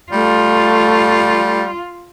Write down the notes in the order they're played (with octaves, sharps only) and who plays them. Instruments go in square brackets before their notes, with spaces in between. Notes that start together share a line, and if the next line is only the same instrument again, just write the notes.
[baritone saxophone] G3 [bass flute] A3 [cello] F4